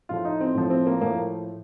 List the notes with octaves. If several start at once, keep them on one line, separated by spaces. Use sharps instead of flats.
A2 F3 A3 F4
D#4
C4
A2 F3 A3
C4
A#3
A2 F3 A3 A#3